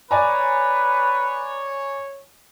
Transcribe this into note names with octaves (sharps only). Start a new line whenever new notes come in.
B4 C#5 D5 G#5 A#5